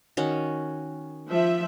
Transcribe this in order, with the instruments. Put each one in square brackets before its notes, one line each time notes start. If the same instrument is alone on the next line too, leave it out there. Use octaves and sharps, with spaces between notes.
[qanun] D#3 C#4 F#4
[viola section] F3 E5